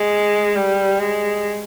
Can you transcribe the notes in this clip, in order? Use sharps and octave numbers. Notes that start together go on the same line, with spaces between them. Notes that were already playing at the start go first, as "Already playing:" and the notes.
Already playing: G#3
G3
G#3